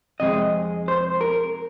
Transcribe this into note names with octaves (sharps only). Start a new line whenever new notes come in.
F2 C3 G#3 D#5
C5
A#4